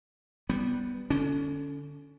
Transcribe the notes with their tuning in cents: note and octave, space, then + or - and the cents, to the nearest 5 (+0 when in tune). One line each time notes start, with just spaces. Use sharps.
G3 +0 B3 +0
D3 +0 C#4 +25